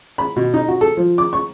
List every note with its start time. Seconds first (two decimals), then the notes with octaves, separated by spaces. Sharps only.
0.18 B5
0.36 B2
0.54 D#4
0.68 F#4
0.81 A4
0.97 F3
1.18 D6
1.33 C#6